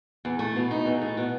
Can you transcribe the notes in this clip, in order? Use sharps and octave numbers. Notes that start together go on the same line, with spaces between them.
E2
A3
B2
D#4
E2
A3
B2